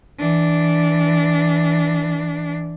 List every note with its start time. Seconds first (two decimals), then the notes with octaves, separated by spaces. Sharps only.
0.19 E3 D4